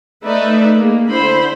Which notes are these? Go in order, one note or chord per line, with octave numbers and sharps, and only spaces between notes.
A3 D#4 B4 D5 E5
G#3 A#3
D3 E4 C5 B5